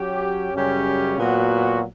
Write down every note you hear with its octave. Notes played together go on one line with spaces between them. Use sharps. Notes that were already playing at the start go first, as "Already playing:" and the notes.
Already playing: F#3 C#4 G4
F#2 C#3 G3 C#4 G4
A#2 F#3 B3 F#4